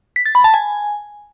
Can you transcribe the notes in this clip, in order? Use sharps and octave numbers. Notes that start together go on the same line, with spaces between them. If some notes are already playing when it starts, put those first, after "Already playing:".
B6
A6
B5
A5
G#5